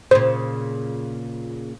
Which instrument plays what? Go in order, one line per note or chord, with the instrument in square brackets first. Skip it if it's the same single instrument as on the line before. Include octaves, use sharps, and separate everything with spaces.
[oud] A#2 C#3 [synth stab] C5